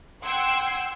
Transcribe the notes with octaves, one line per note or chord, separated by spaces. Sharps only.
F#5 G5 C6 E6 G#6